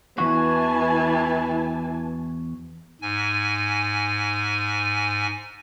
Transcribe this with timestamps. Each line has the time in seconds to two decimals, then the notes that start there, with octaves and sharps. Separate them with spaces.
0.18 E2 E3 F#4 G#5 A5
3.01 G#2 G#5